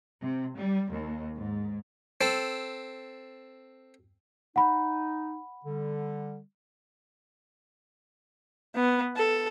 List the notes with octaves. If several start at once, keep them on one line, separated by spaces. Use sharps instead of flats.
C3
G3
D#2
G#2
C4 A4
D#4 F#5 B5
D3 G3
B3
A4